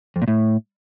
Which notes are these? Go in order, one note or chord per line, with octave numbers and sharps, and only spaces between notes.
F2
A#2
A2